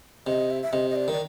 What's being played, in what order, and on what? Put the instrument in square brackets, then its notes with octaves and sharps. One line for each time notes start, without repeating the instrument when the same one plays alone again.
[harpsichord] C3 [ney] D#5
[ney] E5
E5
[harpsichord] C3 [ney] D#5
[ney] D#5
D5
[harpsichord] D#3 [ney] D5